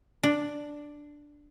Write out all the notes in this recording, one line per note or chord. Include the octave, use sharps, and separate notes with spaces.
D4